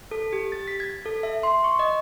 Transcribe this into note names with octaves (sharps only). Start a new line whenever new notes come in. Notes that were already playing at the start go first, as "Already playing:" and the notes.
A4
G4
A6
B6
G#6
A4
E5
C6
C#6
D#5